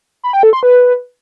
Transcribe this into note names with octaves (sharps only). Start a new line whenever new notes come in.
B5
G5
A4
C6
B4